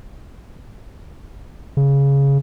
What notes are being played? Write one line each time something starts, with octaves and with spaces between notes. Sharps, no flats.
C#3